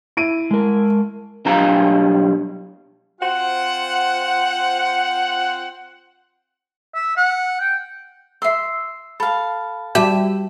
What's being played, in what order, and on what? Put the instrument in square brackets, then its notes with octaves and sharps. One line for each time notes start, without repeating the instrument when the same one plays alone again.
[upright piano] E4 D7 D#7
[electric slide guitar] G#3 A#4
[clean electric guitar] B1 G3 D4 F5 A#5
[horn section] C4 F4 C5 F#5
[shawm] E5
F#5
G5
[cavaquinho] E5 C6 [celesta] E6 C7
[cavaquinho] A4 F5 [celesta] B5
[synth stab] G3 G4 [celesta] F#4 A5 E7 [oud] E5